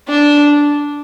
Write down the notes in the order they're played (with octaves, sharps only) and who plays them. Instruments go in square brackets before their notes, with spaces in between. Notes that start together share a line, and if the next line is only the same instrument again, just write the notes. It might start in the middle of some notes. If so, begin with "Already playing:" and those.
[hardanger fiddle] D4